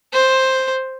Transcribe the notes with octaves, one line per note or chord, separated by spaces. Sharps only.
C5